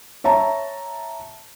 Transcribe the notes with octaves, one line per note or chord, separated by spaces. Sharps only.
C#5 E5 A5 A#5